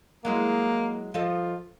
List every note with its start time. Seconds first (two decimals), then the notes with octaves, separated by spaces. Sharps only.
0.25 F#3 G#3 A#3 E4
1.14 F3 F4 A4 D#5